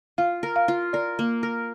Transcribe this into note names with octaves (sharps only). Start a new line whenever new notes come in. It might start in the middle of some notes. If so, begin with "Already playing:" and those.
F4 F5
A#4
F5
F4
A#4 D5
A#3
A#4